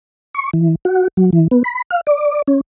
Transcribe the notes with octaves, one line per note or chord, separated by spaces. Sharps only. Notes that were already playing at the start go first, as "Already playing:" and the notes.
C#6
E3
F#4
F#3
E3
B3
B5
F5
D5
C#4